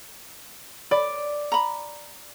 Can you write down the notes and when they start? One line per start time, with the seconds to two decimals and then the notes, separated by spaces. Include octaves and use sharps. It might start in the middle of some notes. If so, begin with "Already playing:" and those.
0.91 D5 B5
1.52 A#5 B5